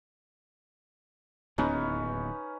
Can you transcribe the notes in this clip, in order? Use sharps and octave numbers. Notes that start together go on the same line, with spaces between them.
D1 D#2 B3 C#4 D#4 B4